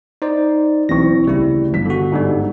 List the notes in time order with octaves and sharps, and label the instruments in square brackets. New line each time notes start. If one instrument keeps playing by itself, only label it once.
[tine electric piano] D#4 C5 D5
[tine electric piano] B1 A#6 [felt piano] E3 C4 C#6
[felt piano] D2 A2 C#3 [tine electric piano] G3 E4
[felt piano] G1 B6
[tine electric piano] D3 F#4
G#2 D3 G3